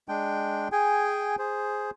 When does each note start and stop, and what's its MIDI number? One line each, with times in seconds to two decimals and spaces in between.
0.08 0.68 56
0.08 0.68 62
0.08 0.68 79
0.72 1.36 68
0.72 1.36 79
0.72 1.36 80
1.39 1.91 68
1.39 1.91 72